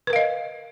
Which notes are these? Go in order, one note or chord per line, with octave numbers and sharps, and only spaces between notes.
A#4 B4 D#5 F5